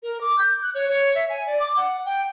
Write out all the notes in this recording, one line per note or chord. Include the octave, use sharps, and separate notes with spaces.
A#4
D6
G6
F#6
C#5
C#5
E5
G#5
D5
D6
F#5
G5